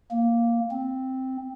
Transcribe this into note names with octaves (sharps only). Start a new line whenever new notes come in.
A#3
C4